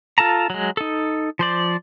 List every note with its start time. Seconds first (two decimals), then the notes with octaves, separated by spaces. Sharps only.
0.18 F4 A4 A5 A#5
0.50 F#3 G#3
0.77 D#4 A4
1.39 F3 C5 D5